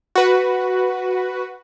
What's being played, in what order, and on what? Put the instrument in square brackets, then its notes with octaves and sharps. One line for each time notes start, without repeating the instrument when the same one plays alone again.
[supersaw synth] F#4 B4